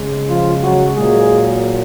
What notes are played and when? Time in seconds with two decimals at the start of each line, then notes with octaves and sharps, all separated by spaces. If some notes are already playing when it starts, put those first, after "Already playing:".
Already playing: C#3 G#3
0.29 F3 F4
0.62 F#3 F#4
0.94 A#2 F#3 G#3 A#3 G#4